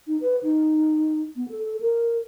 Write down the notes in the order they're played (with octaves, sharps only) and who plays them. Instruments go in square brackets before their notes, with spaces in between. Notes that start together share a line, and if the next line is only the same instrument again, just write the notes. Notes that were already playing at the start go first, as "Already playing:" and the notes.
[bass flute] D#4
B4
D#4
B3
A4
A#4